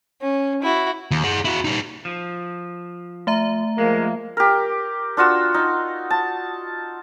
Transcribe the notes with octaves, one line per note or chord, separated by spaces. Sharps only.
C#4
E4 F#4
D#2
G#4 F#5
E4 F#4
G3 D#4
F3
A3 E5 A#5
F3 G#3 A#3
G4 A#4
D4 F4 F#4 E6
D#4
A5